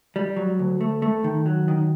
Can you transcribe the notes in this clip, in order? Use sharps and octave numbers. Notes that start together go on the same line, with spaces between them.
G3
F#3
D2
A3
A3
D#3
F#3
D#3